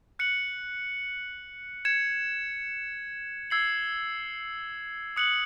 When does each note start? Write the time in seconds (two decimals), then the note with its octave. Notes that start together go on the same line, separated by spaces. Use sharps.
0.19 F#6 C#7 F#7
1.85 G#6 C#7 E7
3.50 E6 G#6 C7 F#7
5.16 D#6 F#6 C#7 F#7